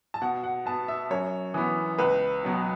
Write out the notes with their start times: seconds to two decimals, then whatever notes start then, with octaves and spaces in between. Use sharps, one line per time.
0.14 A5
0.22 B2 F#5
0.43 F#5
0.65 B3 A5
0.88 E5
1.10 F#2 C#5
1.54 E3 B3
1.98 C#2 B4
2.43 B2 F#3 B3